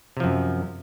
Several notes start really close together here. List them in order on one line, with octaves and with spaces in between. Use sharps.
C3 F3 F#2